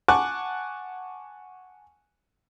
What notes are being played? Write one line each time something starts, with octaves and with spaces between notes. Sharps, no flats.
F#5 G#5 A5 C#6 D6 F#6